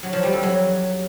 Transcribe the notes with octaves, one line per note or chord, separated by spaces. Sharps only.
F#3
F3
G3
F2
F#3